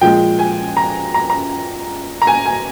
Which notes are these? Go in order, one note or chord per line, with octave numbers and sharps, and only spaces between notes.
A#2 F3 G#3 G5
G#5
A#5
A#5
A#5
A#5
G#5
G#5